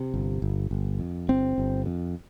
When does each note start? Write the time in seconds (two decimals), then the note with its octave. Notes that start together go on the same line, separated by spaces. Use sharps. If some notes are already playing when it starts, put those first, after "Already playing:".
Already playing: C3
0.14 G1
0.42 G1
0.71 G1
1.00 F2
1.29 G1 C4
1.58 G1
1.86 F2